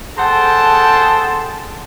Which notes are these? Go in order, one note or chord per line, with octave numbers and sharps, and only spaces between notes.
G#4 A4 C5 F#5 G5 A5